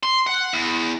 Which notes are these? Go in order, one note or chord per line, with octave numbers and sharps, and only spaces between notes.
C6
F#5
E2